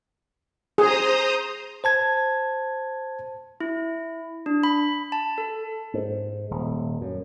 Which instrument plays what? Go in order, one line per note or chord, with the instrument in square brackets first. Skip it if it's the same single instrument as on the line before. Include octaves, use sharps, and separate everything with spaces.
[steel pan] G#4 [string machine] C5 A#5 D#6
[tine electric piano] C5 A5 G#6
[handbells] E4
D4
B5
A5
A4
[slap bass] G#2
D#1
F#2